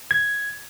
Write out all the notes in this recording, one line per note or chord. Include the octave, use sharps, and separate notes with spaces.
G#6